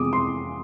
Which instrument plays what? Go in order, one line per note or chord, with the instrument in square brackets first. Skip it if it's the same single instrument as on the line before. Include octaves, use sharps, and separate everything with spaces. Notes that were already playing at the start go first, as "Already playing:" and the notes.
Already playing: [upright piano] F2 C3 E3 G#3 B3 D6 D#6
C6